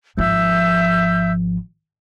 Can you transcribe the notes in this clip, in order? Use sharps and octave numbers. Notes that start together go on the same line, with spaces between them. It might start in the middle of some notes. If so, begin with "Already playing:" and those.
G#1 F3 E5 E6 G6